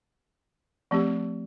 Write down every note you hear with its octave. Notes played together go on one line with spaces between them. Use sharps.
F3 A3 C4 G4